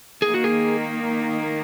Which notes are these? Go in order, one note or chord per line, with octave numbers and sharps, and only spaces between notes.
D#3 A#3 D#4 G#4
F#4
G#4